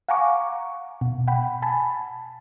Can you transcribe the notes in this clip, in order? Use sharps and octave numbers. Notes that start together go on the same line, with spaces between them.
F5 F#5 G#5 A#5 C#6 D6
B2
F#5 G5 B5
G#5 A5 B5